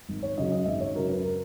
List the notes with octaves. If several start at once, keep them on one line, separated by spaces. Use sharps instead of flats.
G#1
C#5
F#2 C#3 F#3 D#5
D#5
G#1 E5
C#5
F#2 C#3 F#3 A#4
B4
A#4